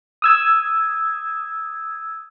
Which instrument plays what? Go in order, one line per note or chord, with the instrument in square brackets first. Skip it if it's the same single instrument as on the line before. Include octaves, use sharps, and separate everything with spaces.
[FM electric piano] D#6 E6 G#6